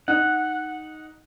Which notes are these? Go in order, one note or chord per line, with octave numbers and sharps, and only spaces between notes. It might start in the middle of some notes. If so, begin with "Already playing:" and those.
D#4 F#5